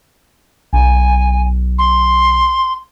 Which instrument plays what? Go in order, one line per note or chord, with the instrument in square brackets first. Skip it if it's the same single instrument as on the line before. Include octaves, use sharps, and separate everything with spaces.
[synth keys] B1 [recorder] G#5
[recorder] C6